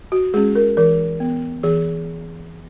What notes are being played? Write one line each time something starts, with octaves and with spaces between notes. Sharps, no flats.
F#4
G#3 C#4 G#4
A#4
E3 A#4
B3
E3 G#4